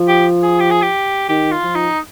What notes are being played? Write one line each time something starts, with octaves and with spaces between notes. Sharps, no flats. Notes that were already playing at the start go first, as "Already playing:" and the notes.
Already playing: F3
G4
G#4
G4
G#4
G4
D#3 G4
F4
F3
D#4